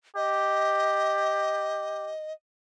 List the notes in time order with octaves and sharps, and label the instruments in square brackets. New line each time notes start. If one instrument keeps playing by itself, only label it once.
[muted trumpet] G4 [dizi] D#5